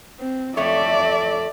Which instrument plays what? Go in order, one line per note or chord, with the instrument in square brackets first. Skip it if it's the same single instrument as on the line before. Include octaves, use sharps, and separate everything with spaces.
[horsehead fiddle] C4
[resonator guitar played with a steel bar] F2 A3 C#5 [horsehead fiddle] D5 E5